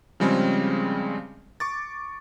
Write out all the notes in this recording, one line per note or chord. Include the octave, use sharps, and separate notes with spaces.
C#3 F3 G3 G#3 C4 C#4
C#6 D6 A6